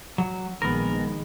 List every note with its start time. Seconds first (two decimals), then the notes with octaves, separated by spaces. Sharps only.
0.18 F#3
0.62 A#1 D#3 G#3 B3 A#4